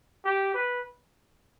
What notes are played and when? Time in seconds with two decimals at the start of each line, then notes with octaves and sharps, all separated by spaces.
0.25 G4
0.54 B4